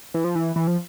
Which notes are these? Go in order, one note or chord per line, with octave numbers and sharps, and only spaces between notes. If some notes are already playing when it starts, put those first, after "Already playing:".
E3
F3
E3
E3
F3